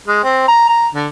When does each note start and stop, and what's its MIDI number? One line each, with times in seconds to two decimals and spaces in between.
0.08 0.19 56
0.23 0.48 60
0.48 0.64 82
0.69 0.87 82
0.95 1.08 50